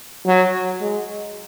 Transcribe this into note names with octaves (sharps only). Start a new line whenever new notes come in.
F#3
G#3